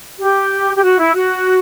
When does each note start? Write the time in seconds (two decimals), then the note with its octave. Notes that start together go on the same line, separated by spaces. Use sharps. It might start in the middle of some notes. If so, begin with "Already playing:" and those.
0.19 G4
0.75 G4
0.82 F#4
0.98 E4
1.13 F#4